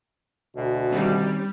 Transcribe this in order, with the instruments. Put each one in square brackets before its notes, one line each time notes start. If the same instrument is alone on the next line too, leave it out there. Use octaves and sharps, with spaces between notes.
[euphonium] D2 [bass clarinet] B2
[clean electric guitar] D#3 C4 C#4 [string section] G3